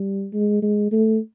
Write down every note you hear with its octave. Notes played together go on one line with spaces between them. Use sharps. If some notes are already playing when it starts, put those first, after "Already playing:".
Already playing: G3
G#3
G#3
A3